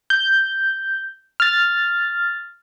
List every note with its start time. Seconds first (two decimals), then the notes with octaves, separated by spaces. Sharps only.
0.10 G6
1.40 F6 A6